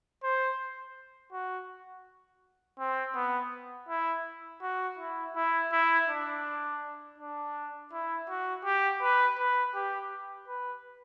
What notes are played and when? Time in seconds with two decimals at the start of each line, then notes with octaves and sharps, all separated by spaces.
0.23 C5
1.32 F#4
2.79 C4
3.15 B3
3.89 E4
4.62 F#4
4.99 E4
5.36 E4
5.72 E4
6.09 D4
7.18 D4
7.92 E4
8.29 F#4
8.65 G4
9.02 B4
9.39 B4
9.74 G4
10.48 B4